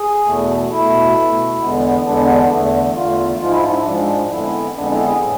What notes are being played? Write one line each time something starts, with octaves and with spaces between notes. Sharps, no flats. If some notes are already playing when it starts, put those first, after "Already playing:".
Already playing: G#4
E2 B2 A3
B2 A3 E4
B2 A3
E2 D3 G#3 B3
E2 D3 G#3 B3 D4
D4
E2 D3 A3
E2 D3 A3 F4
G#2 F3 G#3 F4
E4
D4
E4
G#2 F3 G#3 D4
F2 D3 G#3 B3 E4
F2 D3 G#3 B3 D4
E4
G#4
A2